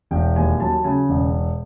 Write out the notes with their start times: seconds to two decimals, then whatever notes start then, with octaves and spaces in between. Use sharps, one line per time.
0.11 E1 G5
0.36 D#2 G#5
0.60 F#3 A5
0.84 C#3 G#5
1.09 E1